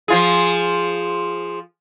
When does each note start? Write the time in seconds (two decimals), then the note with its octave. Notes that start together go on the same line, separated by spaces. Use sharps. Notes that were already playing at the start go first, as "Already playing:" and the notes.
0.08 F3 F4 G#4